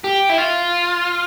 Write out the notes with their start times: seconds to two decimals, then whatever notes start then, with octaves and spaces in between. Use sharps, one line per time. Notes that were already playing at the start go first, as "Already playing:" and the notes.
0.04 G4
0.29 E4
0.38 F4